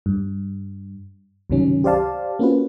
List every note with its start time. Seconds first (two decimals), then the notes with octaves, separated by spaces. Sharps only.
0.06 G2
1.50 C#2 G2 C3 D#3 F#3 C#4
1.84 G4 C5 D5 F5 A5
2.39 A#3 C4 C#4 F4 F#4 B4